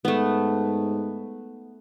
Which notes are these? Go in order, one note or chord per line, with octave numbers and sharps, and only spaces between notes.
G#2 A3 B3